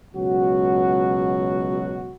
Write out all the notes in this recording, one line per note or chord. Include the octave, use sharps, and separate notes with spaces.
C#2 B2 F#3 F#4